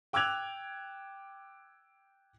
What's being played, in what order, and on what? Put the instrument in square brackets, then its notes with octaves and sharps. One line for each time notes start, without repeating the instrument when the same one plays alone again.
[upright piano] G5 D6 E6 F#6 G#6 F7